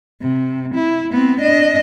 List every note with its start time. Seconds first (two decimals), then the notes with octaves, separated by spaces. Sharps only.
0.21 C3
0.75 E4
1.12 B3 C4
1.40 D4 D#5